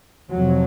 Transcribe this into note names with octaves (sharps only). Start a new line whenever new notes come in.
F1 F2 C3 F#3